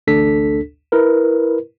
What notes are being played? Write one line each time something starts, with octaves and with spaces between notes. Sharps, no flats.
A1 D2 D4 A4 B6
E4 A#4 B4